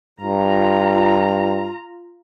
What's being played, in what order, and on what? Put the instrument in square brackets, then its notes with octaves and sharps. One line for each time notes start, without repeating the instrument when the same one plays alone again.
[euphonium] G2 [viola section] F4 A#5